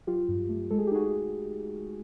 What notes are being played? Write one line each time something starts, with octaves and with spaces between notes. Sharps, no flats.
F#3 F4 G4
G2
A3
G#3 A4
G#4
G4
D#4 F#4 G#4